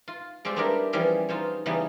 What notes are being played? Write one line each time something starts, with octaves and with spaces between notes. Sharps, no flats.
F4
G3 G#3 C4 F4 G4
G3 B3 D4 E4 G4 A#4
E3 F3 G3 C#4 G#4
D#4 F4 C5 C#5
C#3 E3 G3 B3 C#4 D#4